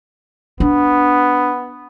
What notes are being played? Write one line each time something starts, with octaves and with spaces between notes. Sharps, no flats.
B3 D4